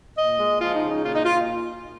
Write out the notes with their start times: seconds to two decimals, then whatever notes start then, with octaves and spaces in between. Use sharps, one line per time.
0.18 A#2 D#5
0.39 G#3
0.61 F3 F4
0.75 D#4
0.82 C#3
0.90 D#4
1.03 A#2 F4
1.15 D#4
1.25 A#2 F4